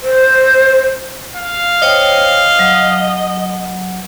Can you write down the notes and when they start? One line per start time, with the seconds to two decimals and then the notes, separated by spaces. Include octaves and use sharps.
0.02 C5
1.35 F5
1.82 C5 C#5 D#5 G5
2.59 F#3